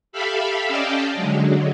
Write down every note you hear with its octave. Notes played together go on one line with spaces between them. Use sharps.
G4 A4 E5 F5 B5
C#4 D5 D#5 F5 G5 A5
D3 F#3 G#3